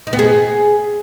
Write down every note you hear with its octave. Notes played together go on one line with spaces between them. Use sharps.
D#4
B3
G#4